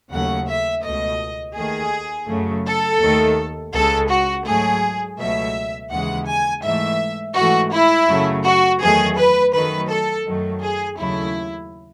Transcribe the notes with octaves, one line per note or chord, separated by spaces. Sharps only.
D#2 C#3 F#3 A3 F#5
E5
C#2 B2 A3 D#5
D#2 D#3 A3 G#4
F#2 C#3 F#3 A3
A4
D#2 D#3 A3
C#2 C#3 G#3 A4
F#4
G#2 F#3 A3 G#4
C#2 B2 F#3 A3 E5
D#2 C#3 E3 G#3 F#5
G#5
G#2 E3 A3 E5
G#2 E3 A3 F#4
E4
F#2 C#3 F#3 A3
F#4
E2 D#3 F#3 A3 G#4
B4
F#2 D#3 F#3 A3 B4
A4
F#2 D#3 F#3 A3
G#4
D#2 C#3 F#3 A3 E4